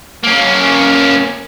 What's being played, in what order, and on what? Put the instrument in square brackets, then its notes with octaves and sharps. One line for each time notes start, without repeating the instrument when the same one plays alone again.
[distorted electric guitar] A#3 C#4